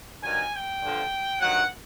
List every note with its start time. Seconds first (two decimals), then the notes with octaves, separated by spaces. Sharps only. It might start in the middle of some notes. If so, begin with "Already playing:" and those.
0.23 G2 D#3 F#3 G#5
0.53 G5
0.82 G2 D3 F3
1.40 G2 D#3 F#3 F#5